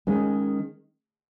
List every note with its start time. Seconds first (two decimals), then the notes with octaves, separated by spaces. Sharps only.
0.07 D#3 G#3 C#4